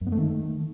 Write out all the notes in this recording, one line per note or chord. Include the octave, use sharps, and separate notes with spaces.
F#2
B3
A3
D#3